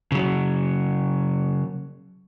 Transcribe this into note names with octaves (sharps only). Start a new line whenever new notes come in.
C#3 F#3